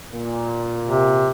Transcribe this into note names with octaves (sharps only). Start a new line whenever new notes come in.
A#2
C3